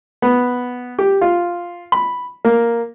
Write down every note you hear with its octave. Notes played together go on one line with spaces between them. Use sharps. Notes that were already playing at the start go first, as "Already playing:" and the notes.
B3
G4
F4
B5
A#3